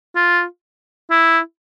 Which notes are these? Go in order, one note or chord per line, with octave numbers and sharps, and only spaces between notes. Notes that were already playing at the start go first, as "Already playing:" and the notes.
F4
E4